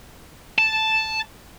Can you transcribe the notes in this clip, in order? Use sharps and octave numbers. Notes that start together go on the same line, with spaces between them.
A5